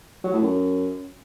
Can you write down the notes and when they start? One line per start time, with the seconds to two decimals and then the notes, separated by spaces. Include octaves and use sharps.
0.24 F#3
0.33 A2
0.42 F#2